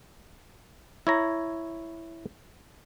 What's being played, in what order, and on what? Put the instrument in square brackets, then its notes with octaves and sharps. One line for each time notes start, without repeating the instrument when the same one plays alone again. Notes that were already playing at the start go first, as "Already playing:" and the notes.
[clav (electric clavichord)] E4 C#5 A#5